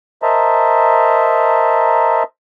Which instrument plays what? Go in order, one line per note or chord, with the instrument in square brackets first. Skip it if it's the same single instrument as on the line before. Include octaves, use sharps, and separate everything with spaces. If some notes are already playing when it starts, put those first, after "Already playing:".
[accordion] A#4 C5 D#5 E5 A5 A#5